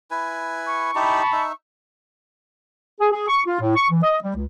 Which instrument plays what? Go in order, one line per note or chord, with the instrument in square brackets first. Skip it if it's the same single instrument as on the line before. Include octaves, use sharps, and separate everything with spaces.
[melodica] E4 B4 G#5
[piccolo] C#6
[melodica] D#4 E4 G4 [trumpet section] A5 B5
[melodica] D#4 E5
[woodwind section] G#4
G#4
C#6
F4
A2
C#6
E3
D#5
G3
C#2